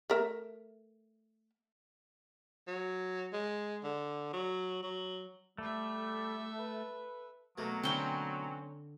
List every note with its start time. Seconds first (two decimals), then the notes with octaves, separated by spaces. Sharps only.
0.10 A3 A#4 E5
2.67 F#3
3.33 G#3
3.84 D3
4.33 F#3
4.83 F#3
5.58 G3 A3 A4 E5
6.59 B4
7.58 B2 F#3 A3 A#3
7.83 D3 C4 C#4 E4 G5